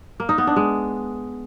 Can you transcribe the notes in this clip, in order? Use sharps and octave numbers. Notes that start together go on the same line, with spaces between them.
A#3
D#4
B3
D4
G#3